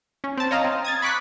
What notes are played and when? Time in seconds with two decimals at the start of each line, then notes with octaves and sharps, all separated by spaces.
0.24 C#4
0.37 C4 A5
0.51 C#5 D#5 F5 A#5 D#6
0.64 C4
0.85 D#6 G#6 A6
1.02 B5 C#6 D6 F#6 B6